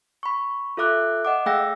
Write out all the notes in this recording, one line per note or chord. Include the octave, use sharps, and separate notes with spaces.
B5 C#6
F4 A4 E5 D6 F#6
D#5 F#5 D6
A3 G#4 F5 G5 E6 A#6